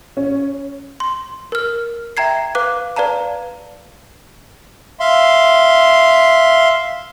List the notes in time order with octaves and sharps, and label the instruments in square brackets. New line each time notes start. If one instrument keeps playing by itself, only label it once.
[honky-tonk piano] C#4
[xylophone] C6
A#4 F6
E5 G5 A#5 G#6 C7
B4 F5 D6 F#6
B4 D5 F5 A5 A#5
[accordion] E5 F5 C6